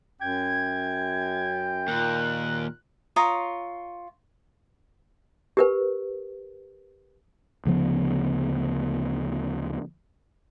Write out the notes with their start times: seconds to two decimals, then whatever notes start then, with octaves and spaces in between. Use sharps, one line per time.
0.21 F#2 G5 G#6
1.88 D#2 A#2 A#4 F#6
3.16 F4 C#5 A#5 D#6
5.57 G4 A#4 B4
7.65 D2 C#3 F3 B3